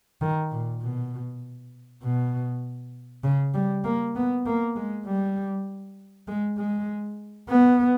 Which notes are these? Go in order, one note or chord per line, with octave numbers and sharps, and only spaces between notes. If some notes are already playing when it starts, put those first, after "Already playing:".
D#3
A#2
B2
B2
C#3
G3
A#3
B3
A#3
G#3
G3
G#3
G#3
B3